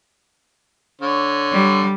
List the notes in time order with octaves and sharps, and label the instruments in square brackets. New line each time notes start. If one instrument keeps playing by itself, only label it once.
[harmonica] D3 C#5
[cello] G3